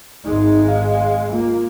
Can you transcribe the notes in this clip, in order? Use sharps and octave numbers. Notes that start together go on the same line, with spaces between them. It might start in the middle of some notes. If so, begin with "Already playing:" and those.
G#1 G#3 D#4
F5
A#3 F4